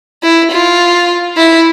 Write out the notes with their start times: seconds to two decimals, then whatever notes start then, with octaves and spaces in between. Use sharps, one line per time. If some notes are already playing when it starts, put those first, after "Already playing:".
0.23 E4
0.51 F4
1.36 E4